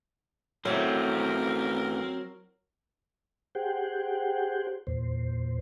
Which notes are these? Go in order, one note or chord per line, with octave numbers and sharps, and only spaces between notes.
F#2 F#3 A3 C4 E4 A#4
G4 G#4 C5 F#5 G5
E2 A#2 C5